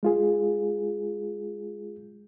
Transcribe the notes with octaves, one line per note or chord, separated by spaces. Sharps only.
G#3 F4 G#4